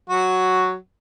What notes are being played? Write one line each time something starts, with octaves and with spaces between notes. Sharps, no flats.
F#3 F#4